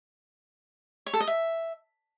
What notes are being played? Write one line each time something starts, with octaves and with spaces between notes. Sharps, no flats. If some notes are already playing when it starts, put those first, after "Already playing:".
C#5
A4
D#5
E5